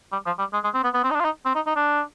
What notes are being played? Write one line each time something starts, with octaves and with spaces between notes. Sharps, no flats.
G3
F3
G3
G#3
G#3
C4
B3
B3
C4
D#4
D4
F4
D#4
C4
D#4
D#4
D4